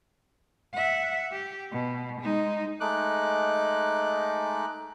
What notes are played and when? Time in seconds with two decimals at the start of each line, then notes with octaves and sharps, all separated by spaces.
0.74 E5 F#5
1.32 G4
1.72 B2
2.20 G#3 D#4
2.80 G#3 A3 D#4 D6 F#6